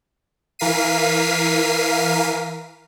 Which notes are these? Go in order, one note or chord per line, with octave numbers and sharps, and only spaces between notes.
E3 A#4 F5 B6 C7 D#7